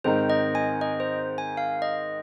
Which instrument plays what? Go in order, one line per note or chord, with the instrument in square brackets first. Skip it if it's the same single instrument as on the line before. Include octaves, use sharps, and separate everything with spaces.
[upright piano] G#2 D#3 C4 D#4 A#4 [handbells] C5
[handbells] D#5
G#5
D#5
C5
G#5
F5
D#5